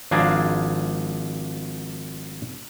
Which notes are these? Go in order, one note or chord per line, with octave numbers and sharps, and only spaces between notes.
G#1 F3 D4 G#4 F5 A#5